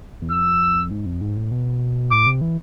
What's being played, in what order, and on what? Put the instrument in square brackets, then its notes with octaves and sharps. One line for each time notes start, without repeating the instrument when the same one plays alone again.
[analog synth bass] E2
[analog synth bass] F2 [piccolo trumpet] E6
[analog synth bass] G#2
F2
G#2
A2
B2
[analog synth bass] A2 [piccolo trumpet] D6
[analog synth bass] C3
E3